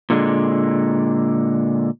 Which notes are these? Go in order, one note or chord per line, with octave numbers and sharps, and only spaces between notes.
A#2 D3 G#3